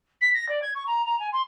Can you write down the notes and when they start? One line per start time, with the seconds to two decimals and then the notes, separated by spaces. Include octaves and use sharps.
0.21 B6
0.34 A#6
0.49 D5
0.62 G#6
0.75 C#6
0.87 A#5
1.06 A#5
1.20 G#5
1.33 C6